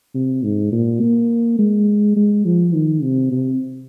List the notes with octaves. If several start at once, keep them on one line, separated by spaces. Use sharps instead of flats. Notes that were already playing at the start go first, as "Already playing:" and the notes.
C3
G#2
A#2
A#3
G#3
G#3
F3
D#3
C3
C3